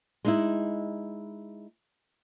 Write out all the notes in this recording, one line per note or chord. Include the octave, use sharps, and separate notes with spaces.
G#3 D#4 E4